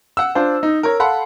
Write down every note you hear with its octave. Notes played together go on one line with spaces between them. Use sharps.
F#5 E6
D4 F4 C5
D#4
A#4 C#5
A4 F5 F#5 B5 C6